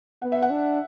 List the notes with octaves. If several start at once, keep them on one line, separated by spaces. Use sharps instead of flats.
B3 F#5
E5
F#5
D4